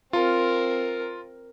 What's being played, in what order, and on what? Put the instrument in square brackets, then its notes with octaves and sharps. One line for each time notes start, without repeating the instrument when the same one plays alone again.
[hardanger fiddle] C4 A#4 [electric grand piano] F4